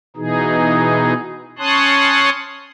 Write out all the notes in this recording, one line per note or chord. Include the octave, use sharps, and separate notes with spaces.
B2 E3 D#4 G#4
C#4 C#5 A5 C6 D#6 F#6